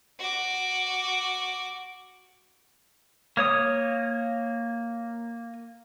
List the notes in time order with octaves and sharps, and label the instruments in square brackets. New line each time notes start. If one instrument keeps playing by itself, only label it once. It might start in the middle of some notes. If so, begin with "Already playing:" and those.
[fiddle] F#4 D6
[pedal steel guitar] A#3 C#5 D#6